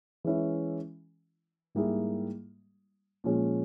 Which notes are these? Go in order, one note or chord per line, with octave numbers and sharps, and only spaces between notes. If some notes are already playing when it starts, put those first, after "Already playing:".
E3 G#3 C#4 E4
G#2 G3 A#3 E4 G#4
A#2 F3 G#3 C#4